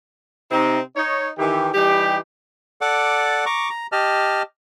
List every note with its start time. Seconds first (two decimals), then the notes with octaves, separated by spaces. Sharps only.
0.51 C3 C4 D#4
0.96 D#4 C#5
1.38 D#3 E3 G4
1.74 E3 G3 D#4 G4
2.81 A4 D5 F#5 D6
3.46 A#5 C#6 D6
3.70 A#5
3.92 G4 D#5 A5 F6